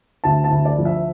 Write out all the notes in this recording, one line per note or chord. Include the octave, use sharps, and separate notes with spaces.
D2 A5
A5
D2
D5
F3
E5